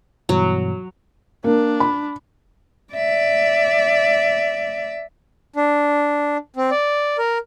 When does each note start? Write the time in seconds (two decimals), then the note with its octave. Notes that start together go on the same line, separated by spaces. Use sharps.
0.29 G2 B2 E3 F#3
1.44 A#3 D4
1.80 B5
2.93 D5 E5
5.56 D4
6.56 C4
6.71 D5
7.18 A#4